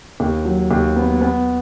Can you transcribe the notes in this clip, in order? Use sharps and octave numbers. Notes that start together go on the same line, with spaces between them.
D#2
F#3
D#2
B3
B3